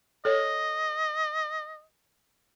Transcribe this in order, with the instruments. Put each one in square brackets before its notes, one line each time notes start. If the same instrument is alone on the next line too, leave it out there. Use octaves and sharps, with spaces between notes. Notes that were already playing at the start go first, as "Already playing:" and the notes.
[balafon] A4 C#5 [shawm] D#5